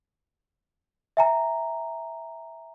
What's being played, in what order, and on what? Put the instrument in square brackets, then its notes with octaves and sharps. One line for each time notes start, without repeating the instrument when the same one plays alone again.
[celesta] E5 G#5 A#5